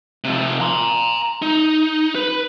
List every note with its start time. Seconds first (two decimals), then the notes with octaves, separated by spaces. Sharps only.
0.24 C3 F3
0.61 A#5 C6
1.42 D#4
2.15 B4